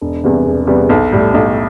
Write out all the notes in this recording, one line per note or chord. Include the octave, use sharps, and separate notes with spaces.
E1
E2 C3 G3 B3
E1
E2 C3 G3 B3
B1
A2 G3
B1